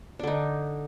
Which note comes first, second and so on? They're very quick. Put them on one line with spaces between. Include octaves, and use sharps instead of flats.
D4 D3 D#4